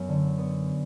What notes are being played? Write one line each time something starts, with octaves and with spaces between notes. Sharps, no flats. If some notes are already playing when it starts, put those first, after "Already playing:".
Already playing: F#2 F#3 B3
D3
B3